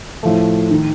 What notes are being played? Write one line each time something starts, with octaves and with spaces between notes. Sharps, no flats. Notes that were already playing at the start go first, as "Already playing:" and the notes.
A2 F3 A3
D#3